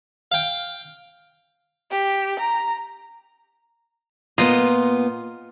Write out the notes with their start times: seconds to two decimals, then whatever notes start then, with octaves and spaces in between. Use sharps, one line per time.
0.32 F5 G5
1.91 G4
2.39 A#5
4.38 A#2 B3 F4 D#5